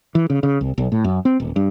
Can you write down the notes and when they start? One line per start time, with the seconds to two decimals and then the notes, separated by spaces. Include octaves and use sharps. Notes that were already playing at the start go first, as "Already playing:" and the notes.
0.15 E3
0.30 C#3
0.43 C#3
0.61 C2
0.78 B1
0.92 A2
1.04 F#2
1.25 C4
1.40 D#1
1.56 G2